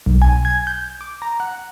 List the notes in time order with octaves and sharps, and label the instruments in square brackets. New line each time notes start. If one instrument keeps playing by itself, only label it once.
[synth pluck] B1
G#5
G#6
G6
D6
A#5
F#5